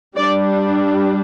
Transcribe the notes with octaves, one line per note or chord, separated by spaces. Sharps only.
G3 D4 D5